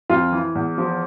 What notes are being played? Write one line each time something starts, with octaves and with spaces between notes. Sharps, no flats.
F2 F4
E3
E2
F3